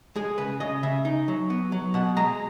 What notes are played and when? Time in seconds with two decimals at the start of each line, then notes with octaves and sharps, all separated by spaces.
0.16 G#3 G#4
0.38 C#3 B4
0.60 C#3 D#5
0.83 C#3 E5
1.05 D#4
1.28 F#3
1.50 B3
1.72 F#3
1.94 B2 F#5
2.17 G#3 A#5